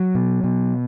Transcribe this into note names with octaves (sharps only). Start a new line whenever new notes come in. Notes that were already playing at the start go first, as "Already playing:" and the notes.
Already playing: F#3
B2
B2